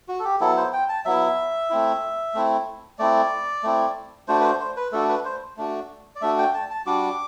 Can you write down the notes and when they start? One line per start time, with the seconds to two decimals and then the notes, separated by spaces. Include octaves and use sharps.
0.08 F#4
0.19 A4
0.24 G4
0.40 F#3 B3 E4 A4
0.57 C5
0.73 G5
0.89 A5
1.05 F#3 B3 E4 E5
1.70 A3 C4 E4
2.34 A3 C4 E4
2.99 A3 C4 E4 D5
3.63 A3 C4 E4
4.28 A3 D4 F#4 C5
4.40 B4
4.44 C5
4.60 C5
4.77 B4
4.92 A3 D4 F#4 A4
5.09 B4
5.25 C5
5.57 A3 D4 F#4
6.16 D5
6.21 A3 D4 F#4 E5
6.38 G5
6.54 A5
6.70 A5
6.86 G3 D4 F#4 D6